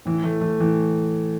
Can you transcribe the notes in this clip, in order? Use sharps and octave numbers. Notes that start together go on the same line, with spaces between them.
A2 E3
E3 A3
E3 A3
A2 E3